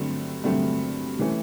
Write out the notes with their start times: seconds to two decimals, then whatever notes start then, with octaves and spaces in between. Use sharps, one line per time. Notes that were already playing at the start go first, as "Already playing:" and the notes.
Already playing: G2 D3 F#3 A3 C4
0.44 G2 D3 F#3 A3 C4
1.18 C3 E3 A3 C#4